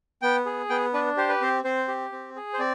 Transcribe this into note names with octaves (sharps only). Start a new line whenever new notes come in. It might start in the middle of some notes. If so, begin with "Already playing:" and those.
B3 G5
G#4
B3 G5
D4 B4
G4 C5
B4
C4 C5
C4 C5
G4
C4
G#4
C5
C4 D5